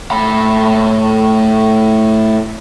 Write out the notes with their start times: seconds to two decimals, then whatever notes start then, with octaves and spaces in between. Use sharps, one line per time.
0.11 A2 B5